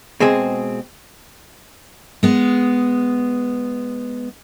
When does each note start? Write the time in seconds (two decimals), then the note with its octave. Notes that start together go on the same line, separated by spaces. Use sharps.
0.20 B2 G#3 C4 G#4
2.23 G#3 B3